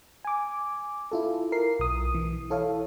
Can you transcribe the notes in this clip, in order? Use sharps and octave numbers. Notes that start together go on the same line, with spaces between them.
G#5 D6
E4 F4 A4
A#4 C7
B1 D#6
E3
E4 A4 C#5 F5